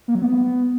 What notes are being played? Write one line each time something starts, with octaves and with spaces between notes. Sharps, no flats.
A#3
F#3
B3